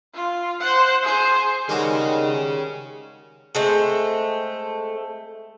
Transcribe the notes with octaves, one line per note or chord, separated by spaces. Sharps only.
F4
C5 F#5
G#4 C5
D#3 G3 G#3 F#4 G#4 C#5 G#5
G#3 A3 C4